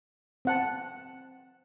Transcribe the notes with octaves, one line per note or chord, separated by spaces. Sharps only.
C4 F#5 A5